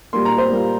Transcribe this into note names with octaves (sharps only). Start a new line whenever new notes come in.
A#2 G3 A#3 C6
A#5
C5
A#2 G3 A#3